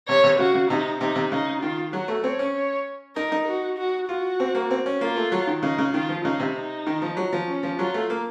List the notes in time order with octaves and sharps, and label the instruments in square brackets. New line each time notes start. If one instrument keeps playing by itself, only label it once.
[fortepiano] C3 [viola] C#5
[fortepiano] C3
[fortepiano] C#3 [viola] F#4
[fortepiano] C#3
[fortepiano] C3 [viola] D#4
[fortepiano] C3 [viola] D#4
[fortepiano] C3
[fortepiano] C#3 [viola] D#4
[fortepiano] D#3 [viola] F4
[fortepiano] F#3 [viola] F#4
[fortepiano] A3
[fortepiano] C4 [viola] C#5
[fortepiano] C#4
[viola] C#5
[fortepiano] D#4 [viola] A#4
[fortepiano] D#4
[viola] F#4
F#4
[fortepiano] F4 [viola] F#4
[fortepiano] C4
A#3
C4
C#4
[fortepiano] A#3 [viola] F4
[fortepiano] A3
F#3
D#3
[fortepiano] C#3 [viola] D#4
[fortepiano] C#3
[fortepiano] D#3 [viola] F4
[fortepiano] F3
[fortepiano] C#3 [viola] D#4
[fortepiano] C3
[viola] D#4
[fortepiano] D#3
F3
F#3
F3
[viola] C#4
[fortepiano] F3
[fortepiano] F#3 [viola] F4
[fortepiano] A3
A#3